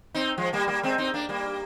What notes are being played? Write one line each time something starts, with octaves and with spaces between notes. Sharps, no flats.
C4 D#4
F3 G#3
G3 A#3
G3 A#3
G#3 C4
C4 D#4
A#3 D4
G3 A#3